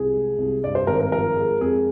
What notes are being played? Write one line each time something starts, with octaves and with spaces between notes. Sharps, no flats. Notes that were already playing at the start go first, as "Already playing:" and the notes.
Already playing: C2 G#4
G#3
C2
G2 D5
C5
G#1 A#4
A#4
F3 A#4
G#3
F2 G#4